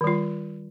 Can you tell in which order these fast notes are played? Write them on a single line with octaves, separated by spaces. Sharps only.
D#3 G3 F4